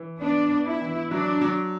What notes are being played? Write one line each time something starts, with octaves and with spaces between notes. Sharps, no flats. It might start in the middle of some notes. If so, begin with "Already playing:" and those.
Already playing: E3
B3 D4
B3
E4
E3
F#3 D4
F#3